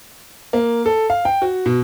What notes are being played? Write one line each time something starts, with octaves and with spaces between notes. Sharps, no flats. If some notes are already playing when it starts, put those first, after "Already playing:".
A#3
A4
F5
G5
F#4
B2